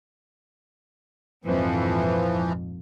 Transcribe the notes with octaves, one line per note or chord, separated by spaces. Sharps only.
A#1 F2 G#2 E3 F3